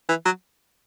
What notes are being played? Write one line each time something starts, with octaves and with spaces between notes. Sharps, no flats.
E3
F#3